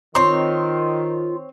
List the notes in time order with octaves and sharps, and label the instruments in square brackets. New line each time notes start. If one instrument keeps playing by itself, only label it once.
[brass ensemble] D#3 [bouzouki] C4 C#5 [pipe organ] F4 [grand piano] C6